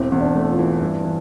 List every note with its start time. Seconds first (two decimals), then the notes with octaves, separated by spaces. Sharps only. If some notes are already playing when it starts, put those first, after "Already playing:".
Already playing: E1 C4 E4
0.12 E2 C4
0.21 D4
0.35 A3
0.51 F4
0.59 E3
0.81 G2
1.05 E3